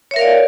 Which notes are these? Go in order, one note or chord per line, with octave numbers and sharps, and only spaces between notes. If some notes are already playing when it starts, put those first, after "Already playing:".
A#4 C#5 D5 E5 F5